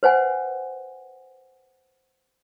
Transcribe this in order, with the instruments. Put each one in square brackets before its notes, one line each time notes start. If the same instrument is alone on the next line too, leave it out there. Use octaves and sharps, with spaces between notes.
[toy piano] B4 C5 F#5 G#5